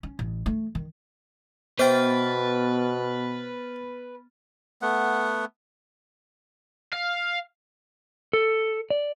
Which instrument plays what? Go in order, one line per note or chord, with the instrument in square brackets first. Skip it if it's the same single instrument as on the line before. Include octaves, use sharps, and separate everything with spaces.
[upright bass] C#4
A1
A3
D#3
[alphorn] B2 [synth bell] B3 F6 A6 [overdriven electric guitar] B4 [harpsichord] C5 G5
[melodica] A3 B3 F#5
[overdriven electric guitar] F5
[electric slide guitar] A4
D5